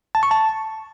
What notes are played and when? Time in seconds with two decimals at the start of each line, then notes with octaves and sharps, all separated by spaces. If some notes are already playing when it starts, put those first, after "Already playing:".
0.15 A5
0.23 C#6
0.31 A5